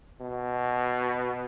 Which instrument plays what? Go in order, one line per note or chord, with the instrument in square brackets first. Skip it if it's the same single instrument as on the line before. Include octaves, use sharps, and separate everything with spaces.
[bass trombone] B2